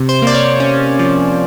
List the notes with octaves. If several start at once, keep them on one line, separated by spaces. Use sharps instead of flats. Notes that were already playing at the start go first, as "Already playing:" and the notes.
Already playing: C3
C5
A#3 D5
C#5
C#4
F3